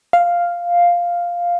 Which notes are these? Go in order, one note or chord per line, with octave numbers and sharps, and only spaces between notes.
F5